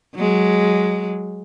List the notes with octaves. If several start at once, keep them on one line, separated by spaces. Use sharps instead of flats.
F#3 G#3